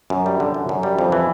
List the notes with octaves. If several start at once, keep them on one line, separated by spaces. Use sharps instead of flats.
F#2
G3
D3
F#2
F#2
G3
F2
E3